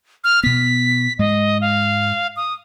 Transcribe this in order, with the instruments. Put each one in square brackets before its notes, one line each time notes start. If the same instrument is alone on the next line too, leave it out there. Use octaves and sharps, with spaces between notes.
[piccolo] F6
[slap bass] B2 B3 [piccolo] B6
[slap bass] G#2 G#3 [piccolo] D#5
[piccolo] F5
D#6